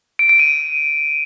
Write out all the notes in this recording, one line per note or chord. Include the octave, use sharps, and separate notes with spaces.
D7
D7
D#7